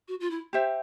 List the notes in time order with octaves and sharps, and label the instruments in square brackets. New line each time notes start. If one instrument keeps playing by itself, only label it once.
[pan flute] F#4
F4
E4
[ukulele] G4 C5 E5